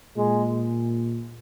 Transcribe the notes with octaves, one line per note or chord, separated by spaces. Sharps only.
A#2 G#3